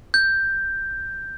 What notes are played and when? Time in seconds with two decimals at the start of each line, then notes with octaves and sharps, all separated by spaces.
0.14 G6